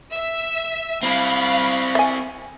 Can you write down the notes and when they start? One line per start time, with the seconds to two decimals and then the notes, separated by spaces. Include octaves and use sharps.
0.13 E5
1.03 C4 E4 F5 B5
1.95 E5 G#5